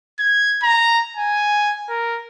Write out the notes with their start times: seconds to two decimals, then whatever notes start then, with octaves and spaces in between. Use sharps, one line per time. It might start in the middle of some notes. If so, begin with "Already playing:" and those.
0.20 G#6
0.63 A#5
1.16 G#5
1.89 A#4